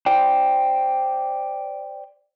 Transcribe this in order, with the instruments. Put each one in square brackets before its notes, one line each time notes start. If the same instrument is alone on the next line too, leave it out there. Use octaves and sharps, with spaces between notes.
[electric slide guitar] C5 D5 G5